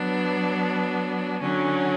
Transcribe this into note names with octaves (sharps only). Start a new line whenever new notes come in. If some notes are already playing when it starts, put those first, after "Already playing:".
Already playing: F#3 B3 D4
D3 F#3 C#4